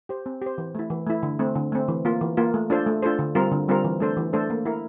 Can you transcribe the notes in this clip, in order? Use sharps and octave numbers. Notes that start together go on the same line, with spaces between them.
G4 C5
C4
G4 C5
E3
A3 E4
E3
A3 E4
D3
A3 C4
D3
A3 C4
E3
A#3 F4
E3
A#3 F4
A3
D4 F4 A4 C5
A3
D4 F4 A4 C5
D3
G3 C4 F4 A#4
D3
G3 C4 F4 A#4
E3
A3 D4 A4 C5
E3
A3 D4 A4 C5
A#3
E4 A#4